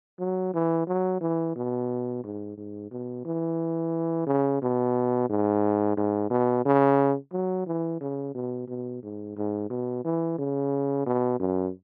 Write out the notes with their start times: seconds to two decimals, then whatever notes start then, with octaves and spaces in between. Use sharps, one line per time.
0.19 F#3
0.54 E3
0.87 F#3
1.21 E3
1.56 B2
2.24 G#2
2.57 G#2
2.91 B2
3.25 E3
4.27 C#3
4.62 B2
5.30 G#2
5.97 G#2
6.30 B2
6.65 C#3
7.33 F#3
7.66 E3
8.01 C#3
8.35 B2
8.68 B2
9.03 G#2
9.37 G#2
9.70 B2
10.05 E3
10.38 C#3
11.06 B2
11.40 F#2